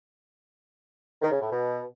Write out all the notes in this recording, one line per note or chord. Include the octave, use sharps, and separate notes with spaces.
D#3
C#3
A2
B2